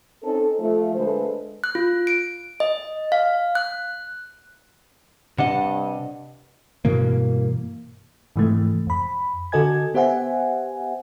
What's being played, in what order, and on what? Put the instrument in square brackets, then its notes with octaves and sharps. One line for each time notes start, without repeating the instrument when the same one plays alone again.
[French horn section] C4 C#4 D#4 A4
F3 A3 F4
D3 G#3 A3 A4 B4 C5
[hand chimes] F#6
F4
D7
D#5
F5
F#6
[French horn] G2 [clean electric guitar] C3 D4 D#5 [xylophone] F#5
[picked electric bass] G2 B2 E3 A#3
[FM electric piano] G#2 C3 E3 F3 G#3 A3
F2 B5
D3 F#4 A4 D#5 G#5 G#6
B3 G4 C5 E5 F#5 G#5